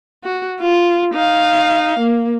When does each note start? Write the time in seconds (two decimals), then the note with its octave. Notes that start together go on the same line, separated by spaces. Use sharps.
0.23 F#4
0.61 F4
1.14 D#4 F5
1.99 A#3